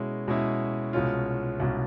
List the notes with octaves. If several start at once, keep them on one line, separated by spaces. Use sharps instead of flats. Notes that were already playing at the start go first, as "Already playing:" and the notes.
Already playing: B2 G#3 C#4 E4
B2 G#3 C#4 E4
C2 B2 G#3 C#4 F4
C2 B2 G#3 C#4 F4